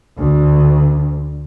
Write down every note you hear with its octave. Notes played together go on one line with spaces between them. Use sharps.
D2